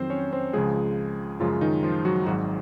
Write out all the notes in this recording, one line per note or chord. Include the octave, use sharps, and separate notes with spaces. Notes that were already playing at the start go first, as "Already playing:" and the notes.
Already playing: F2 D#3 F#3 C4 C5
C#4 C#5
C4 C5
C#2 C#3 F3 G#3 G#4
F#2 C#3 F3 G#3 F4
D#3 D#4
F3 F4
F#3 F#4
G#1 G#2 F#3 F#4